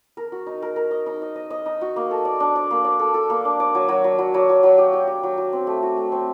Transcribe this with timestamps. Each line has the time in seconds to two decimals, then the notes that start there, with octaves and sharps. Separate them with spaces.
0.17 A#4
0.32 F#4
0.47 D#4
0.62 A#4
0.76 A#4
0.91 D#5
1.06 D#4
1.22 D#5
1.36 D#5
1.50 D#5
1.66 D#4
1.81 F#4
1.96 A#3
2.11 A4
2.25 D5
2.40 D4
2.56 D5
2.71 A#3
2.84 D5
2.99 A4
3.14 A4
3.30 A#3
3.45 D4
3.60 D5
3.75 F#3
3.89 F#3
4.04 F#3
4.18 F#3
4.34 F#3
4.49 F#3
4.63 F#3
4.78 G4
4.93 G4
5.07 G4
5.23 F#3
5.38 F#3
5.53 C4
5.67 A3
5.83 F#4
5.97 A3
6.12 C4